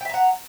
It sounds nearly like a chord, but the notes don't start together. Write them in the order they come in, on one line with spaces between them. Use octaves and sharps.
G5 E5 A#5 F#5